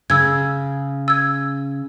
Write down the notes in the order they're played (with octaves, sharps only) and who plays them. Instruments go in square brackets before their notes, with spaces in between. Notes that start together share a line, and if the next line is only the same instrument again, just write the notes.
[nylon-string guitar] C#3 [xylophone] E6 G#6
[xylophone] E6 G#6